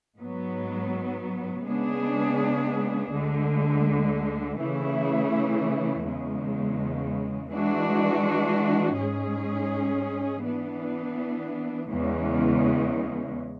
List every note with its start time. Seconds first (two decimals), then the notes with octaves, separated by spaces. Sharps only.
0.18 G#2 F#3 B3
1.64 C#3 G#3 B3 D4 G#4
3.11 D2 D3 G#3
4.57 C#3 E3 A3 E4
6.04 E2 C#3 G#3
7.51 E3 G#3 D4 F#4
8.97 G#2 G#3 C#4 G#4
10.44 E3 B3 D4
11.90 E2 C#3 E3 G#3